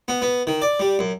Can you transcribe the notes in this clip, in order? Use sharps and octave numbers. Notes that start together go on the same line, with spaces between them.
B3
B3
D#3
D5
G3
F#2